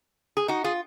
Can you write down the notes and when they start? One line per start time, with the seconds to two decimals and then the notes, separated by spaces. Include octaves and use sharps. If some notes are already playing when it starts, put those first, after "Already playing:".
0.37 G#4
0.48 D#4 F#4
0.64 F4 G#4